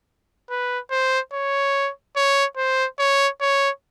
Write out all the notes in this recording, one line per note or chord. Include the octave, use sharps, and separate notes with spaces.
B4
C5
C#5
C#5
C5
C#5
C#5